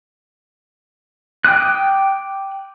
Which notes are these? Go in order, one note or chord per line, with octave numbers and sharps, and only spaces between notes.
G5 D6 D#6 F#6